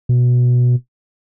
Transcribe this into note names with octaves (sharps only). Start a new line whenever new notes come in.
B2